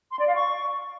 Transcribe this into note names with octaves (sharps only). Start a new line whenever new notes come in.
C6
D5
F5
C#6